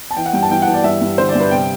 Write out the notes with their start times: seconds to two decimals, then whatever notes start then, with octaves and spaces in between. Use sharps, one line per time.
0.11 A5
0.17 E3 G5
0.26 F#5
0.33 G2 G5
0.42 A5
0.50 E3 G5
0.62 E3 F#5
0.74 D5
0.84 G2 E5
1.01 G2
1.18 D3 C5
1.29 D5
1.35 G2
1.40 B4
1.51 C3 G5